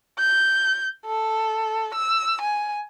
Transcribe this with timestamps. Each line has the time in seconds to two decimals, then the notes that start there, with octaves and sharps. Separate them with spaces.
0.18 G6
1.06 A4
1.94 E6
2.41 G#5